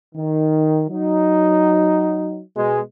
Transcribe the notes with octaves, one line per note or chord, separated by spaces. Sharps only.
D#3
F#3 D#4
B2 G#3